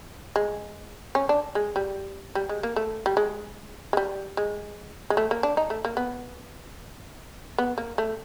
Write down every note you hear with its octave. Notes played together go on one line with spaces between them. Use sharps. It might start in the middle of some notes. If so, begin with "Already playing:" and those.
G#3
C#4
D4
G#3
G3
G3
G#3
A#3
A3
G3
G#3
G#3
G3
G#3
G#3
A3
A#3
D4
D#4
A3
A#3
B3
B3
A#3
A3